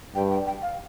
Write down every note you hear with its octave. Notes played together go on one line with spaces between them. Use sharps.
G2 G5
G5
G5
F5